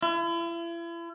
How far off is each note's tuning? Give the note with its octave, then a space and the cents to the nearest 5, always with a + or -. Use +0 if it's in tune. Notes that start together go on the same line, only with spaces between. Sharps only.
E4 +40